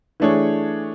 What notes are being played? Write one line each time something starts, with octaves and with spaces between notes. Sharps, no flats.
E3 A3 D4 G#4 C#5